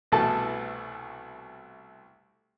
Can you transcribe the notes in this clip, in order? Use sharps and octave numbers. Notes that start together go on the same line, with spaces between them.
C2 B2 E3 A3 A4 A5